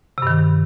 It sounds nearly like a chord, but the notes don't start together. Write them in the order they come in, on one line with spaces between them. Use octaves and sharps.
C3 G2 D#3